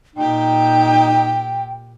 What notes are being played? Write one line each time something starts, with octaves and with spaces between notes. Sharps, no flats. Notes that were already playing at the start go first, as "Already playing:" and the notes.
A#2 D#4 G4 G5